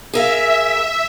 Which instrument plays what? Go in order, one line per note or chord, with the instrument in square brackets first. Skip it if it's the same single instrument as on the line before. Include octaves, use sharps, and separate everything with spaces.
[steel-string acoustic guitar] G#4 A#4 F5 [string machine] E5